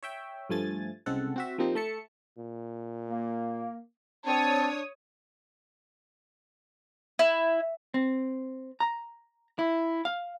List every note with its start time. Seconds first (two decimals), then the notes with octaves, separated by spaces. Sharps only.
0.03 C#5 E5 G5
0.49 G2 F3 A3 G#5 A6
1.06 C2 C#3 G#3 C4 A4 F#5
1.36 C4 F#4 E5
1.58 F3 G3 A#3 C4 D#4
1.75 A3 E5 A5 C#7
2.38 A#2
3.09 A#3
4.26 C4 D4 C#5 A5 D#6
7.19 E4
7.94 C4
8.80 A#5
9.59 E4
10.05 F5